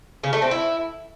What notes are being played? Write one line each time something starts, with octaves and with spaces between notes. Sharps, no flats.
C#3
A3
C4
E4